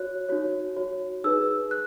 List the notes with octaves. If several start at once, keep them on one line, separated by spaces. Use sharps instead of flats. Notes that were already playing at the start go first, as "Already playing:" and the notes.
Already playing: F#4 C#5 F#6
D#4 F#4 C#5
F#4 C#5
D#4 G#4 B4 E6
F#6